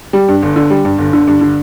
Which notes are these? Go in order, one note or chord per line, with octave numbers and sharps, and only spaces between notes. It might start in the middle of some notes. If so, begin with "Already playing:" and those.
G3
G2
G1
D3
G3
G2
G1
D3
G2
D3